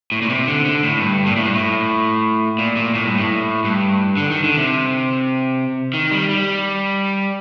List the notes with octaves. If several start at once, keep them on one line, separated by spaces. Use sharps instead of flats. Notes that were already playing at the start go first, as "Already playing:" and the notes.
A2
A#2
C3
D3
D3
A2
G2
A#2
A2
G2
A2
A#2
A#2
A2
G2
A2
G2
D3
D#3
D3
C3
D#3
G3
G3